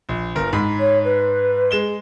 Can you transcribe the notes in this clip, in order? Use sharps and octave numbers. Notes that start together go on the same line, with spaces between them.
A#1
G1 A#4
G#2 B5
C#5
B4
G#3 E7 G7